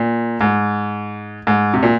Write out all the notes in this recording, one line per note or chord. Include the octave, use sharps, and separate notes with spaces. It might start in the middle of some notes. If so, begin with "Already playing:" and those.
Already playing: A#2
G#2
G#2
C3
A#2